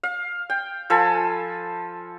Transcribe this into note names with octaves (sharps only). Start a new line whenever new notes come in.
F5
G5
F3 A4 G#5 B5